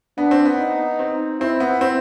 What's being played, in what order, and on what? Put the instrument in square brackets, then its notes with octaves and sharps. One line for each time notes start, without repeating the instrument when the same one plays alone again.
[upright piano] B3 [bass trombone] D4
[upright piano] C4
B3
[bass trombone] D#4
[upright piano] C4
[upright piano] C4 [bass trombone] E4
[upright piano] B3
C4